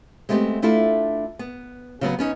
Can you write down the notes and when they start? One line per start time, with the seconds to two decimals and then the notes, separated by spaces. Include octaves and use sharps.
0.29 G#3 A3 B3 C4 G4
0.62 A3 D4 E4 F4 A4
1.39 B3
2.01 C#3 F#3 B3
2.19 B3 C#4 D#4